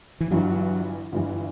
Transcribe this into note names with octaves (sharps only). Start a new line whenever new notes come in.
E3
G1 G2 E3 F#3
G1 G2 E3